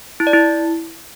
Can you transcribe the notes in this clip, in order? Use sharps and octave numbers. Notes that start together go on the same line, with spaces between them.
E4
D5
E4